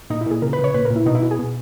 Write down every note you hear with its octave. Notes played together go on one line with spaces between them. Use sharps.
A#2 D#4
E4
A#2 G#4
C#3 A#4
B4
C#3
C#5
A#2 B4
A#4
A#2
E4
B2 D#4
E4
B2 F#4
G#4
B2